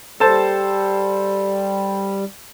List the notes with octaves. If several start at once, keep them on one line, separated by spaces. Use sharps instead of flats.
G3 A4 C5 A5